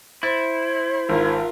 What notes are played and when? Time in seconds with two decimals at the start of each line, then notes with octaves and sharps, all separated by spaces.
0.23 E4 C5 A6
1.09 G#1 F4 A#4